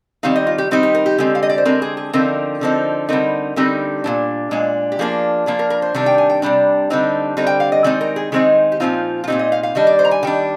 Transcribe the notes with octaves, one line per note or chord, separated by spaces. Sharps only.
D#3 G3 C4 D#4 F5
D#5
F4
G4
D#3 G3 C4 D#4 G4
G4
A#4
G4
D3 G#3 C4
F5
D#5
D5
C5
D3 G#3 C4 A#4
G#4
G#4
D3 F3 C4 D#4 A#4
D3 F3 C4 D#4
D3 G3 C4 D#4 A#4
D3 G3 C4 D#4
A#2 G#3 D4
A#2 G#3 D4
G4
F3 A#3 D4 G#4
F3 A#3 D4 G#4
A#4
A#4
C5
C3 D#3 G3 D4
G5
G#5
G5
C3 D#3 G3 D4
D3 G3 C4 D#4
D3 G3 C4 D#4
G5
F5
D#5
D#3 G#3 C4 D#4 D5
A#4
G#4
D#3 G#3 C4 D#4 G#4
G4
A#2 F3 C4 D#4 F4
F4
A#2 F3 C4 D#4 G4
D#5
F5
F5
D#3 G3 D4 D#5
D5
C5
A#5
G#5
D#3 G3 D4 G5